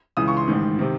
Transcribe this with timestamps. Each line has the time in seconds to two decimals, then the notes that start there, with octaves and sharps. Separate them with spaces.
0.17 C#2 C#3 E3 D#6
0.28 C#6
0.37 C6
0.48 A1 G#2 D#3
0.79 C3 D#3